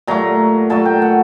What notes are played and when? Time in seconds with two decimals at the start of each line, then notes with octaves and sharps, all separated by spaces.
0.07 A#2 F#3 A3 A#5
0.70 A#2 F#3 A3 A5
0.85 G5
1.02 F#5